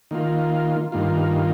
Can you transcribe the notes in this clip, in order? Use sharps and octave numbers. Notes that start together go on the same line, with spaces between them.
D#3 A#3 F4
G2 D#3 A#3 F4